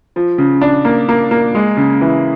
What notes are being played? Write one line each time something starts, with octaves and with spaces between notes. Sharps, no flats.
F3
C#3
D4
A#3
A#3
A#3
G#3
C#3
E3